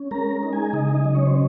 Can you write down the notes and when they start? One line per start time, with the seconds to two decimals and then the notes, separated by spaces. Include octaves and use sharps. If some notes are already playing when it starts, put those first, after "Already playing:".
Already playing: C#4
0.11 G#3 A#4 A#5
0.43 D#4
0.53 G#4 G#5
0.73 C#3 D#4 D#5
0.94 D#4 D#5
1.05 F#3
1.15 C#4 C#5
1.26 C5